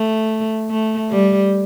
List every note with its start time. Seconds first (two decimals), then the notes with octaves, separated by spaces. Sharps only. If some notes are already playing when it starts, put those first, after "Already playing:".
Already playing: A3
0.70 A3
1.10 G3